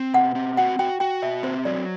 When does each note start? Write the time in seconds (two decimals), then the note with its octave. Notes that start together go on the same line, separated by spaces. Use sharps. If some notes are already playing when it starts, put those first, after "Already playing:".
Already playing: C4
0.14 B2 F#5
0.35 C4
0.57 F#4 F#5
0.79 F#4 G5
1.00 F#4 G5
1.22 B2 E5
1.43 C4 C5
1.65 F#3 D5